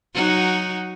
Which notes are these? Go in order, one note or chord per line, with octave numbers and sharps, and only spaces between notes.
F#3 D#4 F#4